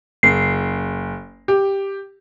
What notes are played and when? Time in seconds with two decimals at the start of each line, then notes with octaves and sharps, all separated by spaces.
0.23 F#1 C7
1.48 G4